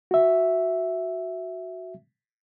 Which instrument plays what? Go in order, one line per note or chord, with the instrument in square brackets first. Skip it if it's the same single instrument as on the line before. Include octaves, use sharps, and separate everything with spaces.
[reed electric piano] F#4 E5